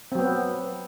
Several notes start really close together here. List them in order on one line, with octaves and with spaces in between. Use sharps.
C4 F#3 B3